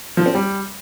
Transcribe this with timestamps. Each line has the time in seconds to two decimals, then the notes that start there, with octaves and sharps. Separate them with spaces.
0.17 F3
0.26 C4
0.35 G3